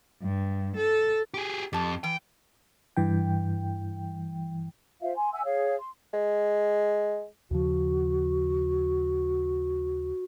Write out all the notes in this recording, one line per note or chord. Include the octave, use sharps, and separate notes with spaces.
G2
A4
G4 G#4
F2 G4 A5
E3 G5
G2 E3 G5
F4 C5 E5 F5
G#5 C6
E5 F#5 G#5 E6
G#4 C#5 F5
C6
G#3
D#2 C#3 F3 F#4